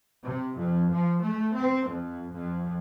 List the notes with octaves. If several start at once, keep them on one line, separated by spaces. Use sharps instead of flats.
C3
F2
F3
A3
C4
F2
F2